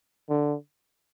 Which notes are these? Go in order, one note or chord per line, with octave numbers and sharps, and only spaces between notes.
D3